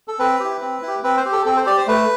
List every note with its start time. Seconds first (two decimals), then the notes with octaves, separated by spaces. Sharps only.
0.08 A4
0.19 C4 B4
0.40 E4 G4
0.61 C4
0.82 E4
0.87 G4
1.03 C4 B4
1.17 C5
1.25 G4
1.32 A4
1.45 C4 A4
1.57 C5
1.66 G4 D5
1.78 C5
1.87 A3 B4